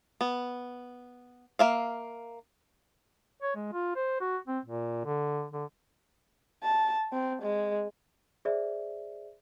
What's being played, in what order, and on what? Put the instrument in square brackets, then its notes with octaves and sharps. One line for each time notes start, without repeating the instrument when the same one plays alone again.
[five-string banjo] B3
A#3 E5 F5
[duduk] C#5
G#3
F4
C5
F#4
C4
A#2
D3
D3
[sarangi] A5
C4
G#3
[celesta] G#4 C5 D5 E5